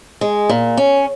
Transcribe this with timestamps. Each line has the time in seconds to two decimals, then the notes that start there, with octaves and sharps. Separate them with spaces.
0.21 G#3
0.49 A#2
0.77 C#4